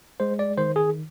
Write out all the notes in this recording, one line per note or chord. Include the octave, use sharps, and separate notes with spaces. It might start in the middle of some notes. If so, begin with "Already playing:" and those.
G#3 C5
D5
D#3 C5
G#4